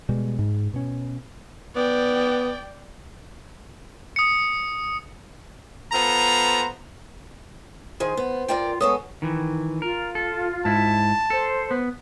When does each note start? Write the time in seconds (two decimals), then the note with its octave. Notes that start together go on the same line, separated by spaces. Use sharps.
0.09 B2 G3 G#3
0.39 G#2
0.74 B2 C#4
1.76 B3 D5 G5
4.16 D#6 C#7
5.93 B3 F4 A4 C5 A#5
8.00 D#3 G#4 C5
8.17 B3
8.48 F4 A#4 D5 G5
8.81 G#3 B3 A4 C#5 D#6
9.22 D#3 E3
9.82 F4 A#4
10.15 A4
10.65 G#2 E4 A5
11.30 A4 C5
11.71 B3